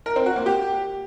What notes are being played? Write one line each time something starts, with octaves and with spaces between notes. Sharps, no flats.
A#4
C4
F#4
A#3
G4